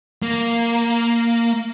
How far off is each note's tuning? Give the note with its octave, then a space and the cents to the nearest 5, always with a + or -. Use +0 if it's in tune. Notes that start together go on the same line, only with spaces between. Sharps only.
A#3 -5